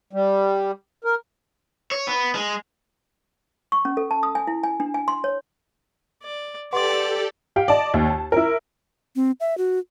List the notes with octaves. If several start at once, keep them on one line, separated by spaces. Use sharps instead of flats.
G3
A#4
C#5
B3
G#3
C#6
C#4
A4
A5
D#6
G#5
E4
G#5
D4
G#5
C6
C#5
D5
G4 A4 B4 D5 F#5 C6
G4 F5 G5
D5 D#5 A5
D#2
A5
E4 A#4
C4
E5
F#4